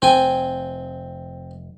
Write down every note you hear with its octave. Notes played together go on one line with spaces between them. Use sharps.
F1 C4 G5 G#5